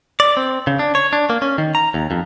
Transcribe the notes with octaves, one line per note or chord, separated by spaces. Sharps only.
D5
C4
C#3
D4
C#5
D4
A#3
C#4
D#3
A#5
D#2
F2